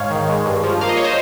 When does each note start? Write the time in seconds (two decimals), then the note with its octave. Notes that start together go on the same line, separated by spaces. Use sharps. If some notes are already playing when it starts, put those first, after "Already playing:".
Already playing: G#2 C#5 F5
0.10 D#3
0.28 G#3
0.46 G2
0.63 F3
0.81 A#3 F5
0.89 D#5
0.97 C#5
1.04 C5 D#5